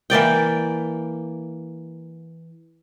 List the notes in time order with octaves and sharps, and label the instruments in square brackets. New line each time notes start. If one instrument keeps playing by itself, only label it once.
[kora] E3 A#3 D5 G5